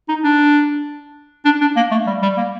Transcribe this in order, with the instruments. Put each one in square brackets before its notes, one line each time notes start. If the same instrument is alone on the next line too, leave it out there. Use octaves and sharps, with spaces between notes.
[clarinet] D#4
D4
D4
D4
A#3
A3
G3
G3
A#3